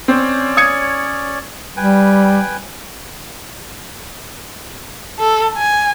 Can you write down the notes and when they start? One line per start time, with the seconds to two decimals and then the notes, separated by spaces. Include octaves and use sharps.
0.08 C4 C#4 C#5 D5
0.57 D#6 G#6 C#7
1.77 G3 B4 G5 G#5
5.19 A4
5.57 G#5